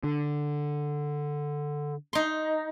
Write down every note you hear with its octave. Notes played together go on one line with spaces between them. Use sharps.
D3
D#4 C6